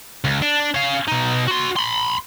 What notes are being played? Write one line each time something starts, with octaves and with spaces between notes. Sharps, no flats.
C#2
D4
C#4 F5
B2 D#4
F#4 C6
B5 C6